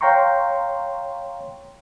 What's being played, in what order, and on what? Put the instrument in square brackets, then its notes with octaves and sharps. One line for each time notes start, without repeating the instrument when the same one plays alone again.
[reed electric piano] C#5 F5 G5 A#5 C6 C#6